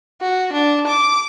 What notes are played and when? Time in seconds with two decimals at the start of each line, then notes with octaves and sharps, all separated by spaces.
0.21 F#4
0.53 D4
0.87 D6